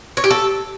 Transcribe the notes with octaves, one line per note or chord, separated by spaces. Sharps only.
C#5
G4
A4